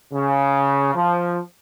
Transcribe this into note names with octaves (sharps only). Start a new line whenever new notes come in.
C#3
F3